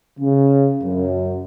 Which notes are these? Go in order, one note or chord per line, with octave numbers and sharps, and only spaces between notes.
C#3
F#2